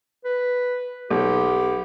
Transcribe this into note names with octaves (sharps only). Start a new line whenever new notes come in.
B4
B1 G4